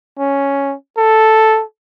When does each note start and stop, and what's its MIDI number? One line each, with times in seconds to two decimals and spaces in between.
0.19 0.75 61
0.97 1.63 69